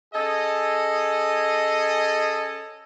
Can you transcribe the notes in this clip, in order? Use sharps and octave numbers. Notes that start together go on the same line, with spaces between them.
C#4 G#4 A4 D#5